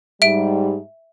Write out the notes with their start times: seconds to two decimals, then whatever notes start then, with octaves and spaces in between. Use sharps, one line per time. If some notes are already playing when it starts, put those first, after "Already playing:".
0.22 G#2 G3 E5 D7